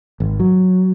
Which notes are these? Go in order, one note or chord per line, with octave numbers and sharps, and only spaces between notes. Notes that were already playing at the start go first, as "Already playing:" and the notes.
G#1
F#3